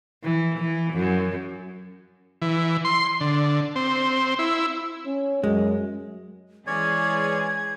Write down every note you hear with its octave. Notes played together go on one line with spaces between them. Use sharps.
E3
E3
F#2
E3
C6
D3
C4
E4
C#4
F#2 G#3
E3 G#3 C#4 G#4 C#5 D5 G#6